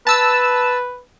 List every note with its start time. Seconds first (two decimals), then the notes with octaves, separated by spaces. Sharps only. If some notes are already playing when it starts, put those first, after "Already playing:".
0.07 B4 A5 E6